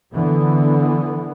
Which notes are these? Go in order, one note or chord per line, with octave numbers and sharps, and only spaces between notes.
D3 E3 B3